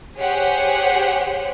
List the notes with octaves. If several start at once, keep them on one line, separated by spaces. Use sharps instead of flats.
G4 G#4 C5 C#5 F#5